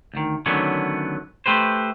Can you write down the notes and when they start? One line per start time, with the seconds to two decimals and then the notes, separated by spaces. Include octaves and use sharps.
0.14 D2 D#3
0.46 D3 D#3 F#3 A3 B3 C#4
1.46 A3 G4 B4 C5